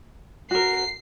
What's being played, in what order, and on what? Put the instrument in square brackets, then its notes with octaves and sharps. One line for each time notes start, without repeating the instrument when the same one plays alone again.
[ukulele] F#4 A#4 [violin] C7